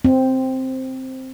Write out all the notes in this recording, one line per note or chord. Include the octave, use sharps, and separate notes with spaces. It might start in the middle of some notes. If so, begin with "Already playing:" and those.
C4